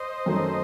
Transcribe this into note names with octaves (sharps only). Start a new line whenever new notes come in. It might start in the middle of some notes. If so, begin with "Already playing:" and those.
Already playing: C5 D#5
F#2 D#3 F#3 A3 D#4